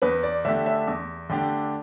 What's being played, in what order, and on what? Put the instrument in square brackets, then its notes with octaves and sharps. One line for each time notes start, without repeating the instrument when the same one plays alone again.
[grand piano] E2 [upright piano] B4
[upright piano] D5
[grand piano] D3 A3 D4 G4 [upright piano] E5
[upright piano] E5
[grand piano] E2
[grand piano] D3 A3 D4 G4 [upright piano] G5